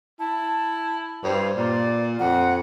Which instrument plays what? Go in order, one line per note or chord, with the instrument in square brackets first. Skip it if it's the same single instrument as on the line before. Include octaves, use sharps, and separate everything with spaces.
[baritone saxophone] E4 [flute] A5
[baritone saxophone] G2 [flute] C5
[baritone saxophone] A#2 [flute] D5
[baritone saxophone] F2 [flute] F#5